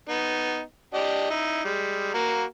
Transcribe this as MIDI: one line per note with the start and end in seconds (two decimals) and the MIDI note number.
0.09 0.61 59
0.09 0.61 63
0.94 1.30 62
0.94 1.30 67
0.94 1.30 75
1.30 1.64 63
1.30 1.64 64
1.65 2.12 55
1.65 2.12 56
2.14 2.43 58
2.14 2.43 66
2.14 2.43 82